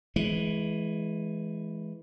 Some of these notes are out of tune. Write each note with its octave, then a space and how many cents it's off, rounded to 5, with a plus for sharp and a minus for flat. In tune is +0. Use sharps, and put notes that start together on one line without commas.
E3 +0 G#3 +20